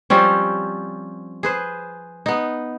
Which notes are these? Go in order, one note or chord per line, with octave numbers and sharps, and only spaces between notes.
F3 G3 C4 C#4
G#4 B4 C5
B3 D#4